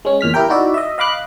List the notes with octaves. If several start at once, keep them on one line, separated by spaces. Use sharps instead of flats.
G#3 C#4
E2 A#2 F6 B6
E4 G4 A#4 G5
D#4 E4 F#4 D5 E5
D#5 E5
D#5 F5 B5 D6 F#6